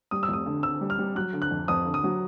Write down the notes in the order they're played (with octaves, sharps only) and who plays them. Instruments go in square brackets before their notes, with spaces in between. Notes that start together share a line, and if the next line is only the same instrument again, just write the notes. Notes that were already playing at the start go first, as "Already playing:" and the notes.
[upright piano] G3 [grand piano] D#6
[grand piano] E6
[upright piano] F1 [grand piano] D#6
[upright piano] D3
[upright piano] D3 [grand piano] E6
[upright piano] G3
[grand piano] F6
[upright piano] G3
[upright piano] F#3 [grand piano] F#6
[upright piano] D3
[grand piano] F#6
[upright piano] F2
[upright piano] F2 [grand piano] D#6
[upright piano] D3
[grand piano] D#6
[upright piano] F#3